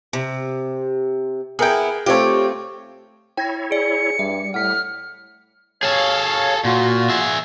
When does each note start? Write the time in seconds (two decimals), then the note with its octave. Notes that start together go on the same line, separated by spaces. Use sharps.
0.13 C3
1.59 B3 E4 G#4 A#4 G5
2.06 A3 C4 F4 G4 C#5
3.37 E4 C#5 G5 G#6 A#6
3.71 G#4 D5 C#7 D7
4.19 G2 G3 E5
4.54 A2 F#5 F6 B6
5.83 G#4 A4 C#5 F5
6.65 A#2 F4 F#4
7.09 G#4 E5